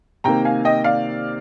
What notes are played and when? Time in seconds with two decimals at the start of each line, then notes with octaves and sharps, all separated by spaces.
0.24 C3 D#3 A#3 G5 A#5
0.45 F5 G#5
0.65 D#5 G5
0.84 D5 F5